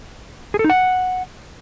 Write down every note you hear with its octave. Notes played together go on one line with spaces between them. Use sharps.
G#4
A4
D#4
F#5